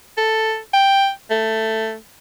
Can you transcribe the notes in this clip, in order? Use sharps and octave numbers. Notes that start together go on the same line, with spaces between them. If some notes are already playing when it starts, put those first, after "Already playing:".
A4
G5
A3